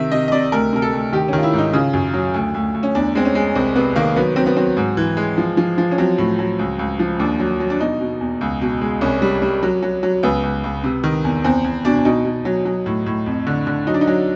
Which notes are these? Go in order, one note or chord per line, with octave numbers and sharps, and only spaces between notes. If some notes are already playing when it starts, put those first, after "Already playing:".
Already playing: C3 D#3 E5
C3 D#5
D#5
C3 D5
D2 A#4
C3 A#4
A4
D2
D#3 G4
D#3 C#4
F4
E4
G#2 D#4
C#3 F4
F#2
F#3
D2
D2
D2
C#4
E2 D4
G#3 C4
C#4
G#3
C2 C4
C3 B3
D#3 A#3
F#3 B3
F#3 C4
B3
F#3 C4
G#2
E3
G#3
F3
F3
F3
C#4
F#3 C4
A2
F#3
C#2
C#2
F3
D#2 D4
F#3
F#3
D4
B2 D#4
B2
E2
C#2
B2
G#3
C2 C#4
G3
G3
F#3
F#3
F#3
C#2 B3
C#2
C#2
C3
D#3
E2
E2 C4
E2
B2 D4
B2 D#4
B2
F#3
F#3
A2
A2
F2
D3
D3
F#3 D#4
D4
D#4
F#3